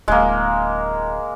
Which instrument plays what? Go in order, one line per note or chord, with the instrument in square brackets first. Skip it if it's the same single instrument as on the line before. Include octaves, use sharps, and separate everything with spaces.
[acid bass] D1 [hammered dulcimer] G#3 A#3